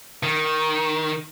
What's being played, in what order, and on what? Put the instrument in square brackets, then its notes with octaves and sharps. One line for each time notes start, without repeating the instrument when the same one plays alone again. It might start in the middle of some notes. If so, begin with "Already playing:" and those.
[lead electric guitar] D#3